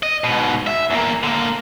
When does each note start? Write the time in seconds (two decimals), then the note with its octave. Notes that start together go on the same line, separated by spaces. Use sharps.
0.03 D#5
0.24 G#2 B2
0.67 E5
0.90 E2 A#3
1.23 D3 A#3